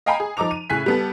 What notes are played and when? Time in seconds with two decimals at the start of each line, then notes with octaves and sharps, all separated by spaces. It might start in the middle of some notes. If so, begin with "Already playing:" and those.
0.06 D#5 F5 G5 G#5 A#5 B5
0.20 G#4
0.37 F3 D#4 A#5 D6 F7
0.51 D#7
0.70 A2 C#3 G#5 F#6 B6
0.86 G3 B3 A4